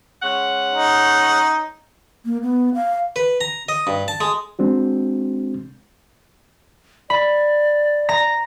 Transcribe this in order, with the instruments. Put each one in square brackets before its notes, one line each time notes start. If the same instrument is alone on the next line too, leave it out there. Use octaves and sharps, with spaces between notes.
[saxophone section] G#3 C#4 F#5
[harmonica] D#4
[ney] A#3
B3
F5
[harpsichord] B4
A#5
D#5
G2
A5
G#3
[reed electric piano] G#3 C4 D4 F#4
[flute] D5 [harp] B5
[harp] A#5 A#6